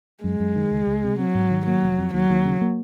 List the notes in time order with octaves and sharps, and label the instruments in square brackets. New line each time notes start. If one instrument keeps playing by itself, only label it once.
[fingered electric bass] F#2 [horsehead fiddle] G#3
[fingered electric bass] F#2
D#3
C#2
C#2
C3
[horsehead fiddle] F#3 [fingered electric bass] C4
[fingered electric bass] G#2
D#3
[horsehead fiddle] F#3 [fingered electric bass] A#3
[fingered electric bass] F1
F2
[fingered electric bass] D#2 [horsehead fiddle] F#3
[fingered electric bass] D#2
C#3
A#3